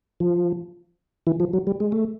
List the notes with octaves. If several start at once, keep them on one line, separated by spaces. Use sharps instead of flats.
F3
E3
F3
F#3
G3
G#3
A3